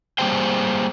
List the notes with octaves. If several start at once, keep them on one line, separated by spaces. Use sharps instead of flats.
G3 A#3 G4 G#4 C5 G5